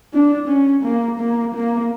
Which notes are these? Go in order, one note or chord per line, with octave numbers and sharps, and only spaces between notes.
D4
C#4
A#3
A#3
A#3